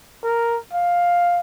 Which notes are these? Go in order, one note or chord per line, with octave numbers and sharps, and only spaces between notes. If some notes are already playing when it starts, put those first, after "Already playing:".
A#4
F5